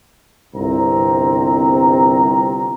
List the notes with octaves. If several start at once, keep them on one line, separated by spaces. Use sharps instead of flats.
G1 C2 G2 C4 A#5